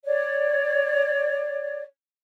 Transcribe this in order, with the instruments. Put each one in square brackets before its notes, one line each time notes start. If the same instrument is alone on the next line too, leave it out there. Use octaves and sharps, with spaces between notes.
[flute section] C#5 D5